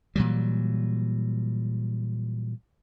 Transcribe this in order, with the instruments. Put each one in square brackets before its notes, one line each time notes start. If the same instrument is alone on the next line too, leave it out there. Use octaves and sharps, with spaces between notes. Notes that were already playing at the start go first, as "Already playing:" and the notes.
[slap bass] A#2 E3 F#3 G3